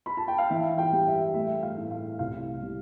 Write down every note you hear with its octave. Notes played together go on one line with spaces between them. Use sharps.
B5
A5
G5
F5
E3 E5
G5
G3
E5
A3 E5
F5
A2
F5
C2 F5
G3